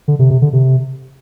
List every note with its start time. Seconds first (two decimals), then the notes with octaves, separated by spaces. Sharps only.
0.08 D3
0.19 C3
0.30 C3
0.42 D3
0.53 C3